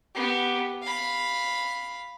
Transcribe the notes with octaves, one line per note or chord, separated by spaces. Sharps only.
B3 G4
F5 B5